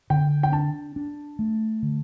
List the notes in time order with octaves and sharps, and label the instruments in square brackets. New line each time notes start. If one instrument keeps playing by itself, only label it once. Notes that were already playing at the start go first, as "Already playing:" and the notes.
[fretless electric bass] D3 [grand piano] G5
[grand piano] G5
[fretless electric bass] D4 [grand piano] A5
[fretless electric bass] D4
A3
D3